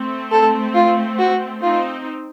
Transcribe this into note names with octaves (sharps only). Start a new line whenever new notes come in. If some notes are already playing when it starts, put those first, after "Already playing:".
Already playing: A3 C4
A4
F4
F#4
C4 D#4 F4